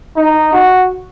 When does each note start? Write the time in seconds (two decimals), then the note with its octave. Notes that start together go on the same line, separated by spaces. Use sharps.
0.16 D#4
0.53 F#4